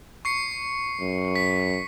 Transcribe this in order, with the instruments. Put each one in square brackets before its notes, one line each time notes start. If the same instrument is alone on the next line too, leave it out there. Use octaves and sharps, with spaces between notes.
[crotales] C#6 C7 C#7
[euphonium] F#2
[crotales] B6